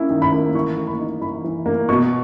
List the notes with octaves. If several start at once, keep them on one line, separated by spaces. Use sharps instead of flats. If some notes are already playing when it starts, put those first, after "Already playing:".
Already playing: A#3 C#4 E4
D#3
B5
A#3
E3 C#6
A#3
B5
D#4
E3 B5
E3
A#3
B2 C#6